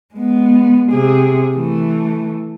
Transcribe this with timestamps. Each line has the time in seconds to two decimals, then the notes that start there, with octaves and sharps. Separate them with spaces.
0.14 G#3 B3
0.91 C3 G#4
1.55 E3 A3